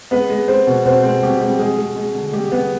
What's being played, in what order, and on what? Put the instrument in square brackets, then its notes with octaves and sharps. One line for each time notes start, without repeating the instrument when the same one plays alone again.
[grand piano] G#3 B3 B4
G#3
G#3 C4 C5
B2
B2 C4 C5
G#3 C4 C5
B2 G3 G4
G3 G#3 G4
G#3 G#4
G#3
G#3
D3
G3 G#3 G4
G#3 B3